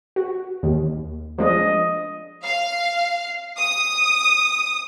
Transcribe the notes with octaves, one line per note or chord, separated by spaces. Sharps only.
F#4
D#2
F3 G#3 D4 D#5
F5
D#6